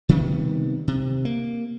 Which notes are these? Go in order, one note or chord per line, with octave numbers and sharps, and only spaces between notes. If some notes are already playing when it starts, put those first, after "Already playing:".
C3 D#3 G3 B3
C3
A#3